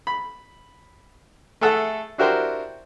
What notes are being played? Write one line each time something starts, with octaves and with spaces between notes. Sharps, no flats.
B5
A3 G#4 A4 E5 F#5
D4 E4 F#4 G4 A#4 C5